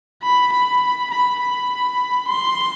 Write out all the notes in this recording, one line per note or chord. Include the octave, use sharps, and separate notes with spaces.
B5
B5
B5
B5
C6